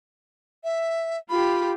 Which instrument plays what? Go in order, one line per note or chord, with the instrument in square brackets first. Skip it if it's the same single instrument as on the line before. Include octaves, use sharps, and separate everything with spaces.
[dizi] E5
[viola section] F4 G4 [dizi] B5